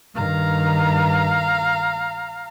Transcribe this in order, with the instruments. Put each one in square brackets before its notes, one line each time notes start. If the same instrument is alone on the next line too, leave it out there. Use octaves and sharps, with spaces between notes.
[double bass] G2 D#3 [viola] F5 A#5